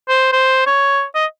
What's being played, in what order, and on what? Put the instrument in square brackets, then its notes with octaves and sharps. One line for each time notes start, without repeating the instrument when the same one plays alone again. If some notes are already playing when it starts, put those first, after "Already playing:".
[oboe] C5
C5
C#5
D#5